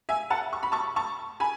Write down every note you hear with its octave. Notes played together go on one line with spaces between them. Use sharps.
E5 G#5
F#5 A5
C#6
B5
A5 C#6
A5 C#6
G#5 B5